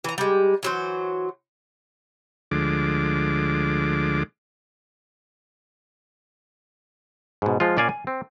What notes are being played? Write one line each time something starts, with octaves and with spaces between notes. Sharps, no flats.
E3 A#5
G3 G#3
E3 F#3 C5
D2 D3 F3 G#3 D6
G#2 B2
F3 G#3 F4
A#2 C#4 D5 F5 G#5
G#5
C4